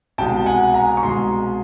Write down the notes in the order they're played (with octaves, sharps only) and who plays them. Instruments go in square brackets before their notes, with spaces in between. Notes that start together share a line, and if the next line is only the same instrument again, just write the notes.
[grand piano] C2 B2 G#3 G5 A5
F#5 G#5
G#5 A#5
C#6
C2 B2 G#3 A#5 C6